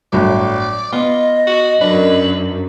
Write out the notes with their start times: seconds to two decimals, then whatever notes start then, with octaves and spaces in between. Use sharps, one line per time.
0.12 G1 A2 F#3 D5
0.93 B3 F4 D#5
1.47 F#4
1.81 F#2 D4 B4